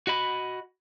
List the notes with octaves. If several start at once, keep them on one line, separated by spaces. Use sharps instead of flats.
F#4 D#5 B5